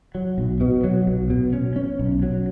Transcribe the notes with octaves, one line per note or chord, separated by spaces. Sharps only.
F#3
B1
B2
F#3
B1
B2
C#4
C#4
B1
F#3